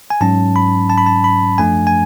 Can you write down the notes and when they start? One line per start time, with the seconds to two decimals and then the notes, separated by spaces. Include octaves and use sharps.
0.10 G#5
0.21 G#2 F#3 C#4 A5
0.56 B5
0.90 A5
0.98 B5
1.06 A5
1.24 B5
1.58 F#2 F3 A3 D4 G#5
1.87 G#5